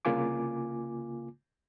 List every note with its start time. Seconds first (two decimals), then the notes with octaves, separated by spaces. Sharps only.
0.05 C2 C#3 A#3 F4 G#5 D6